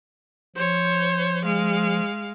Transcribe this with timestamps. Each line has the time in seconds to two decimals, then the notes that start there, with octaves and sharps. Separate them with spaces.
0.56 F3 C5 C#5
1.46 G#3 F5